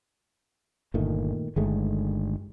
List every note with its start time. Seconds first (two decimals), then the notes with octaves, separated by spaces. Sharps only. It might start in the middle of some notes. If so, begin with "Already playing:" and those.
0.94 G1 A#2 D#3 A3
1.56 G1 D#3 G#3 A3